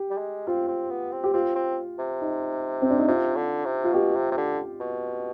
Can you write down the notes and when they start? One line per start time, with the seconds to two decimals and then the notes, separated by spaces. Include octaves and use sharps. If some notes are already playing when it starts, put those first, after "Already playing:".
Already playing: G4
0.11 G3
0.18 G#3
0.47 C4 F4
0.68 C4
0.91 B3
1.12 C4
1.24 G4
1.34 C4 F4
1.56 C4
1.99 C3
2.21 D#4
2.82 C4
2.91 D4
2.98 D#4
3.08 C3 F4
3.36 D3
3.65 C3
3.84 F4
3.93 B2 G4
4.16 C3
4.32 C3
4.37 D3
4.81 B2